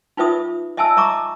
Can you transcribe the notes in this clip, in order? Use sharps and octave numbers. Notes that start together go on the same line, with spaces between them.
D#4 F4 B4 E5 D#6
D#5 E5 G#5 A5 E6
D#5 E5 A#5 C#6 D6